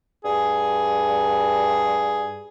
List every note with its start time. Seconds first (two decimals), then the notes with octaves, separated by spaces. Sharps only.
0.25 G2 G#4